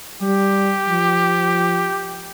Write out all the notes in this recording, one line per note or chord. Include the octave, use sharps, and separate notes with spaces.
G3 G4
F3